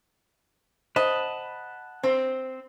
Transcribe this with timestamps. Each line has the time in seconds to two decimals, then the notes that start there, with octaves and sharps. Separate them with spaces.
0.96 C5 D#5 F#5 A5 B5
2.03 C4 C5